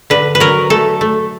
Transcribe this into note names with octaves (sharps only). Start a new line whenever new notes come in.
D3 B4
B4
F#3 A#4
A3 A4
A3